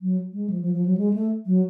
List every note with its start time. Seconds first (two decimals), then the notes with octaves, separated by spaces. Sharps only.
0.02 F#3
0.33 G#3
0.50 F3
0.62 F3
0.74 F3
0.86 F#3
0.97 G#3
1.13 A3
1.46 F#3